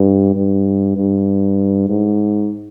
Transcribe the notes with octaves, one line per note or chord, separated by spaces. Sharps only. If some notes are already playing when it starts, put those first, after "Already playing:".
Already playing: G2
G2
G2
G#2